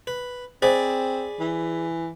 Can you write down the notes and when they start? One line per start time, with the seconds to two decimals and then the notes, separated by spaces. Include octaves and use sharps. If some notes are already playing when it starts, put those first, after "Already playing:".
0.07 B4
0.62 C4 G#4 C5 D5 D#5 B5
1.40 E3